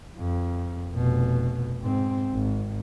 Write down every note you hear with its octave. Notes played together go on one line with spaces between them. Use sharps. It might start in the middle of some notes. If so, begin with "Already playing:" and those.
F2
F1 B2
G#2 C4
G#1